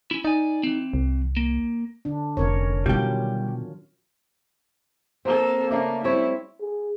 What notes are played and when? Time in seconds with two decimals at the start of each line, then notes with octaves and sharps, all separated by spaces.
0.11 C#4 E4
0.25 D#4 D5 G#5
0.63 E3 C4
0.93 C2
1.37 A#3
2.05 D3 D4
2.37 F1 C#4 A#4 C#5
2.86 B2 D#3 F#3 G3 F4 G4
5.25 A#3 C4 A4
5.70 C#3 A3 A#3 D5
6.04 G3 C4 E4 C#5
6.61 G#4